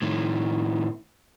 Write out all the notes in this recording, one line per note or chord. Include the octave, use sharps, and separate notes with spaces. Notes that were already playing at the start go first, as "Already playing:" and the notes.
A2 D#3